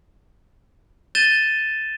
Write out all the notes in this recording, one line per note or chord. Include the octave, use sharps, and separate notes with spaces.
G6 A6 D#7 E7 G7